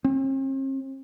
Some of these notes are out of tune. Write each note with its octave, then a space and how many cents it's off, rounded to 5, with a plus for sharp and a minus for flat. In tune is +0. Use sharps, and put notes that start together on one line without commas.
C4 +45